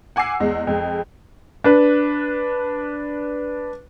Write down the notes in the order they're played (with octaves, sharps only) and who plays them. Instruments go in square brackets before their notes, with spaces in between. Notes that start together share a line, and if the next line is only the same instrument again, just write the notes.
[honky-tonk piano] F#5 G#5 D6 E6 C7
E2 G#3
F2 G#3
[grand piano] D4 B4